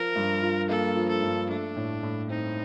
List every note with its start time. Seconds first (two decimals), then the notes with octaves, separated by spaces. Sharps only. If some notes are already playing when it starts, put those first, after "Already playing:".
Already playing: F3 A#4
0.16 G2
0.42 F4
0.69 A#3 A4
0.96 F3
1.09 A4
1.23 G2
1.50 A3 D4
1.76 A2
2.03 A2
2.30 C4 D#4